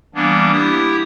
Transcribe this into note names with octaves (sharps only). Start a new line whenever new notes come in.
E3 G3 A#3 B3 D4
E4 G4 D#6